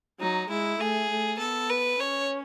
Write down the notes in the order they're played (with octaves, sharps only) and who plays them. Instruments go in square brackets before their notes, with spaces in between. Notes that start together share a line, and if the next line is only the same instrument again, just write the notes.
[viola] F#3 [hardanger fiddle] D#4
[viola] G#3 [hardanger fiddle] E4
[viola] A3 [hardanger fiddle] G#4
[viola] A3
[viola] B3 [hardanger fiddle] A4
[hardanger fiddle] B4
[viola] C#4 [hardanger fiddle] C#5